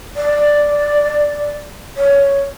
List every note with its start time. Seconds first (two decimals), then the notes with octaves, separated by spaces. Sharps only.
0.16 D5
1.96 C#5